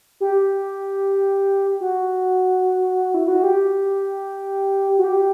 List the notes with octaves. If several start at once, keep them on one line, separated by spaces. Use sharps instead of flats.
G4
F#4
E4
F#4
G4
F#4
G4